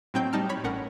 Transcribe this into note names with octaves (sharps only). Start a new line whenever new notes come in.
A2 F#3 C4 D#4 G5 G6
G3 D#4 A5 F6
C#5 B5
A1 A2 C#4 A#4 F#5